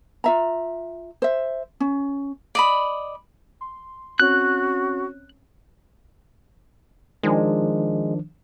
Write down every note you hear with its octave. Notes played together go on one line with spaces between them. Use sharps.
F4 E5 A#5
C5 E5
C#4
D5 D#5 B5
C6
C4 C#4 F#4 C#5 F#6
D#3 F3 G#3 D4